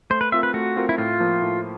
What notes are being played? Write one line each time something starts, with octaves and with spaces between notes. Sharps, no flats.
A3 C5
B4
C4 F4 A#4 E5
B4
A3 F#4
C4 F4 A#4
E4
A2 F4
F3 A#3
A2